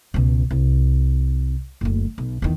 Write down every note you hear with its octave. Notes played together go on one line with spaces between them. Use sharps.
C#2 B2
C2
F#1 D2
B1
E2 D#3